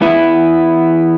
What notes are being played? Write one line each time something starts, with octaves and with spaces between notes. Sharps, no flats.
E2 E3 B3 E4